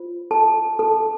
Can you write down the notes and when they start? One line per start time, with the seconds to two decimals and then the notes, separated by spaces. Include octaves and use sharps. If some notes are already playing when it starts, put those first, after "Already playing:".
Already playing: F4 C5
0.31 A4 A5
0.79 A4 A5